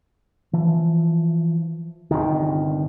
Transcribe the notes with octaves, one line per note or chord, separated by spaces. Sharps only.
E3 F3
G1 C2 C3 D#3